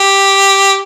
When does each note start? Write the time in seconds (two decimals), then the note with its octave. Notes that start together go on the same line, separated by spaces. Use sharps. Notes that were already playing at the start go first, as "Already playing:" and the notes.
Already playing: G4